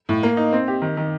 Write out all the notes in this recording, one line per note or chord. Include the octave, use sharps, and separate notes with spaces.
A2
A#3
D#4
C4
G4
D#3
D#3